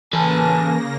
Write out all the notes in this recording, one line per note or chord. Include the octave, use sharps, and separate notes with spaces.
C#3 E3 A#3 A4 B4 G#5 A5 A#6